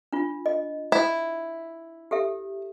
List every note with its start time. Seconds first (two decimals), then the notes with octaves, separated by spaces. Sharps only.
0.12 D4 F4
0.46 D#5
0.92 E4
2.11 G4 A4 E5